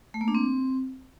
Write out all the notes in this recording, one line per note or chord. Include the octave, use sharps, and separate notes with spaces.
A3
A#3
D4
C4